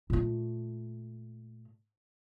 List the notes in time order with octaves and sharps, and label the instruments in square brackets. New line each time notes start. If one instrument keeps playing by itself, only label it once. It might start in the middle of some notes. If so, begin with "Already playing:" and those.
[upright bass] A#2 A3